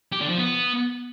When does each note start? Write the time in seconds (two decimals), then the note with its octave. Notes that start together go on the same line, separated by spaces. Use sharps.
0.12 G4
0.21 D3
0.29 F3
0.38 B3